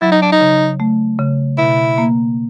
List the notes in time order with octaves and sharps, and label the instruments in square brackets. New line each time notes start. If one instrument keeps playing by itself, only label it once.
[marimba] F#3 [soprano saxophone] E4
[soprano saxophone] D#4
D4
D#4
[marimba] C#3
A3
C#3
[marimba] B2 [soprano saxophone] E4
[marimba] A#3